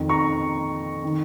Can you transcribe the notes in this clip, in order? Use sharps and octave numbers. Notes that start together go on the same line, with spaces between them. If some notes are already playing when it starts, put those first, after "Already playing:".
Already playing: F2 D#3
A#5 C#6
D#3